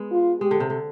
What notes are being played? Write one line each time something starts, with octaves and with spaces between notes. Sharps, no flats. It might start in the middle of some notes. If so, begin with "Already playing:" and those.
Already playing: G#3 B3
F4
G#3 G4
D3
C3
D3